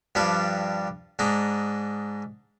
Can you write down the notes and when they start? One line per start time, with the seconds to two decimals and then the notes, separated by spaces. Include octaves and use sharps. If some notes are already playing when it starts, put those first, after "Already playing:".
0.15 G2 F3 G3 D4
1.19 G#2 D4 D#4